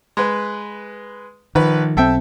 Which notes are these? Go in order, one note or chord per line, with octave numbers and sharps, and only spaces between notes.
G#3 B4
A#1 D#3 F3 B4
B1 C4 A4 E5 G5